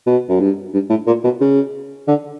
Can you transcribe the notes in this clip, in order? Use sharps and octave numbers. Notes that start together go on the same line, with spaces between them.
B2
F#2
G2
G2
A2
A#2
B2
C#3
D3